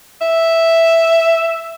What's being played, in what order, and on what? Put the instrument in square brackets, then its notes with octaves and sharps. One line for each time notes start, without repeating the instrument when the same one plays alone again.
[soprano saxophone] E5